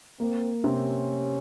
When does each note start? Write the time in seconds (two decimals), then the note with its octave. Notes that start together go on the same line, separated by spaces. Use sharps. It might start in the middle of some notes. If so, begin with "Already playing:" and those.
0.20 A#3 C4
0.64 C3 C4 C#4